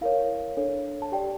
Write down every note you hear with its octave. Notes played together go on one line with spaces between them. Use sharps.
E4 A#4 C#5 F5
D4 A4 C#5
A5
G4 D5 G5